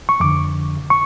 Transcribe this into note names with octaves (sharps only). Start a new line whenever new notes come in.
C#6
F2 D3 D6
C#6